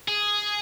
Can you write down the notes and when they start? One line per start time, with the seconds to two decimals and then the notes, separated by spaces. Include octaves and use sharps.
0.08 G#4